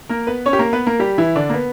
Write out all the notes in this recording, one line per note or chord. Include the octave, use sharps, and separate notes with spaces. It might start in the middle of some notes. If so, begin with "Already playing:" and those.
A#3 A#4
B3 B4
C#4 C#5
G4
A#3 A#4
B3 B4
A#3 A#4
G3 G4
E3 E4
D3 D4
A#3
B3